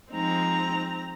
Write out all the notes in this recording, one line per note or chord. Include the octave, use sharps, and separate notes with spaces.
F3 G#3 C4 D#4 A#5